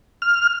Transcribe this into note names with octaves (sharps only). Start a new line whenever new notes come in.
F6